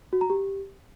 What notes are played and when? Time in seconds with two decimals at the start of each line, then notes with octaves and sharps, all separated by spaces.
0.13 F#4
0.21 A#5
0.30 G4